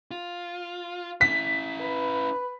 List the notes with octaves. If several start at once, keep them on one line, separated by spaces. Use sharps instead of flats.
F4
C#4 E4 B6
B4